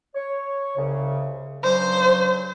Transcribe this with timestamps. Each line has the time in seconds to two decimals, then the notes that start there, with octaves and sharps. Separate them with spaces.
0.15 C#5
0.77 C2 C#3
1.63 G2 C#3 F#3 C5